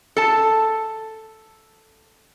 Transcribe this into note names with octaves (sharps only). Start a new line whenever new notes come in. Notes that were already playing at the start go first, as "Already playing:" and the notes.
A4 A5